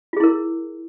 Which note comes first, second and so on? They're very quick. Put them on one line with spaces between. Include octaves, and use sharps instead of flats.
F4 G#4 E4 A#4